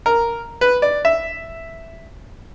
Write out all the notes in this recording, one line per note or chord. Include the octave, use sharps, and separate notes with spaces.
A#4
B4
D5
E5